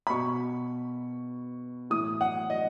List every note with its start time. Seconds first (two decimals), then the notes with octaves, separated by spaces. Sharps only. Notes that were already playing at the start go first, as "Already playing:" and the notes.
0.07 B5
0.10 B2 C#6
1.90 A2 E3 D#6
2.21 F#5
2.50 D#5